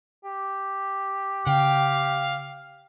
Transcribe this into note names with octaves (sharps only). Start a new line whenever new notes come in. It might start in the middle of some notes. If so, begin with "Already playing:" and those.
G4
C#3 F5 G5